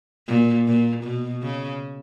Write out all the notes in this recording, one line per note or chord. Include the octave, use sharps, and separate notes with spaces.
A#2
A#2
B2
C#3